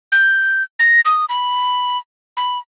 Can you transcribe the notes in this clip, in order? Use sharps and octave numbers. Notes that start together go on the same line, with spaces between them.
G6
A#6
D#6
B5
B5